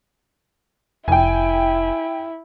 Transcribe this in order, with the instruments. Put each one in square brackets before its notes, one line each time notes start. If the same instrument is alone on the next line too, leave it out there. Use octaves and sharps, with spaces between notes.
[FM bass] F1 [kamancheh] E4 [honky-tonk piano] G5 G#5